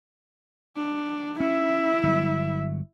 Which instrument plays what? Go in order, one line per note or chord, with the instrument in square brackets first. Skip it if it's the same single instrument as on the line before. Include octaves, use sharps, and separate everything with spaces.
[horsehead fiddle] D4
[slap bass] C#4 [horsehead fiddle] E4 E5
[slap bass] G1 F#3